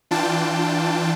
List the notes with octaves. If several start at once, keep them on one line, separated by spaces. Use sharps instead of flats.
E3 D4 F4 G5 A5